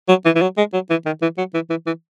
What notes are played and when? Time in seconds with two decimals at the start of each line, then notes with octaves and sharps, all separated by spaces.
0.09 F#3
0.25 E3
0.35 E3
0.41 F#3
0.58 G#3
0.73 F#3
0.90 E3
1.06 D#3
1.22 E3
1.38 F#3
1.54 E3
1.70 E3
1.87 E3